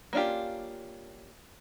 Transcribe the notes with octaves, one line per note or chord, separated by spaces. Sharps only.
A#3 C#4 D4 F4 G4